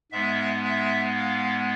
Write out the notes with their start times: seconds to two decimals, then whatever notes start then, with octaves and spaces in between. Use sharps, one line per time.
0.12 G#2 G#3 B3 E5
0.64 E5
1.17 F5